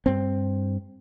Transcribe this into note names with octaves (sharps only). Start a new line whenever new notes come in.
G2 C4